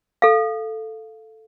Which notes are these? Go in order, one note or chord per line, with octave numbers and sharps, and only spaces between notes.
A4 F5